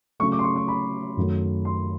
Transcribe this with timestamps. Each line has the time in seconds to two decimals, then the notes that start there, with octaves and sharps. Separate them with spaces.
0.20 C#3 F#3 A3 C#6
0.32 D6
0.39 C6
0.44 C#6
0.56 C#6
0.68 B5
1.17 F#2 D#3 F#3 A3
1.65 C6